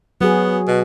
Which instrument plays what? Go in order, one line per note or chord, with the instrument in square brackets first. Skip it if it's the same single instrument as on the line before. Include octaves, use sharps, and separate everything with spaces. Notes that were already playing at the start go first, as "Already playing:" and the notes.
[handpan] F#3 F#4 G#4 [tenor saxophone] B3
[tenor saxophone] B2